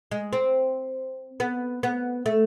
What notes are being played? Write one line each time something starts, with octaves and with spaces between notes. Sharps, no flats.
G#3
C4
B3
B3
A3